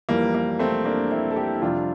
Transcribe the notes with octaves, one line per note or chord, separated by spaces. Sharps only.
F2 E3 G3 A#3
A#3
A3 C4
A#3 D4
C4 E4
A4
E4 G4
E4
F2 C3 G3 D4 F4